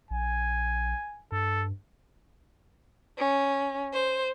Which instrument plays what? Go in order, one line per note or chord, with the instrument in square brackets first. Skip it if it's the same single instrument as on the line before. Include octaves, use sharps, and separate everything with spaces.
[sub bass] A#1 [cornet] G#5
[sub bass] G2 [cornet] A4
[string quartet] C#4
C5